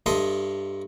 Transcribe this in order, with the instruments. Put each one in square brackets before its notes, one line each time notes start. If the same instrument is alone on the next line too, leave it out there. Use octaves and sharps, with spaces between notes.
[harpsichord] G2 A4 D#5 E5 C6